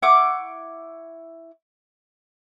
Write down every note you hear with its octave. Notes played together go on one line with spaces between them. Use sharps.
E4 F#5 C#6 D6